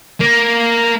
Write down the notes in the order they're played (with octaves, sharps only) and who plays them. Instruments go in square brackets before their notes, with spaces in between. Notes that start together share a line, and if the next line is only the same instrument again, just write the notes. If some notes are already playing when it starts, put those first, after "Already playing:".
[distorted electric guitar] A#3